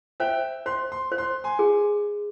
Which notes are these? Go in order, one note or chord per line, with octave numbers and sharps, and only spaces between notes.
C5 E5 G5
C5 C6
C6
C5
C6
G#5 C6
G#4